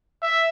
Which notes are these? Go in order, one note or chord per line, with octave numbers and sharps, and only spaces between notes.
E5